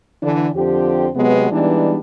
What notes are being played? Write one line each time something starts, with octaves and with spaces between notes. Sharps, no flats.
D3 E3 D4
F2 D3 F3 C4 G4
C3 F#3 G#3 B3
E3 G3 G#3 B3 D4 D#4